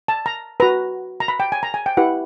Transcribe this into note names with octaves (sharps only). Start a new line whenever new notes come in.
A5
A#5
F#4 B4 A#5
A#5
B5
G5
G#5
A#5
G#5
G5
E4 G4 B4 F#5